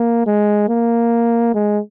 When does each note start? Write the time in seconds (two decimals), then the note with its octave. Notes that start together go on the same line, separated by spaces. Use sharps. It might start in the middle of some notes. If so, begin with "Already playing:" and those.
Already playing: A#3
0.27 G#3
0.69 A#3
1.54 G#3